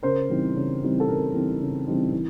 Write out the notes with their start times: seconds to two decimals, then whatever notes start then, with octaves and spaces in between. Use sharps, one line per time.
0.03 C#3 A#4 C5
0.30 E3 G3 C4 D#4
0.56 C#3
0.82 E3 G3 C4 D#4
1.00 A4
1.08 C#3 A#4
1.34 E3 G3 C4 D#4
1.61 C#3
1.87 E3 G3 C4 D#4
2.13 E3